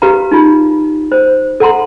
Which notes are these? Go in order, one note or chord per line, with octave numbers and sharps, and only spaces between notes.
G4 B4 F5 A#5
D#4 F4
C5
A4 F#5 A#5 C6